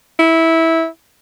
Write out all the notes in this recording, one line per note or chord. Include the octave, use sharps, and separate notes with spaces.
E4